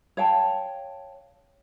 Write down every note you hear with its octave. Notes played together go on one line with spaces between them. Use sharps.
C#5 F5 G5 A5